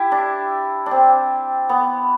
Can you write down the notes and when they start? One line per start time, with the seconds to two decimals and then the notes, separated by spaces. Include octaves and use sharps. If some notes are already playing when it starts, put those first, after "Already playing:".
Already playing: E4 G4
0.12 D4
0.86 D4
0.91 C4
1.69 B3